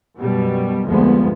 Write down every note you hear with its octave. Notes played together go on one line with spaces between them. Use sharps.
F#2 B2 G3
F1 D2 G2 F3 G#3 B3